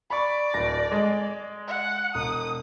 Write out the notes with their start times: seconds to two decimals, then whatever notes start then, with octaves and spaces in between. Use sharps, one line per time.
0.10 D5 B5 C#6
0.54 D1 A#6
0.92 G#3
1.67 F#5
2.15 E1 D#6